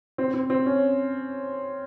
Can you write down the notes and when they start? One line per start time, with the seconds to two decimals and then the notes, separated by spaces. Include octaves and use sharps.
0.18 C4
0.34 C4
0.50 C4
0.66 C#4